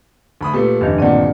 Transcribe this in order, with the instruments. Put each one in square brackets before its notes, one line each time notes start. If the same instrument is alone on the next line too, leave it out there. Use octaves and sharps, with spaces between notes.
[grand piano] D2 B5 D#6
[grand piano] A#2 A3 [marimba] G4 B4
[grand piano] F1 [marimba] G2 D#3 D4
[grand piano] D1 A#2 [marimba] C4 D5 F#5